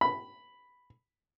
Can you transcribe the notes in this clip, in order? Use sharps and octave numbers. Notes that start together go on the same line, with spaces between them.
B5